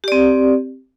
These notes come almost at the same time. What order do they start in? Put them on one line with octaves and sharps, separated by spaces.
G4 D5 C4